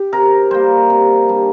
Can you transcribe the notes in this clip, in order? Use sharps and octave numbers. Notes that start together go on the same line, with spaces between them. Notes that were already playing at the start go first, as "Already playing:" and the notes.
Already playing: G4
C3 A#4
G3 A#3 C5
C3
G3 D4